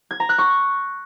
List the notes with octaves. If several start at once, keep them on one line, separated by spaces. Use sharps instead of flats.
G#6
A#5
F#6
C#6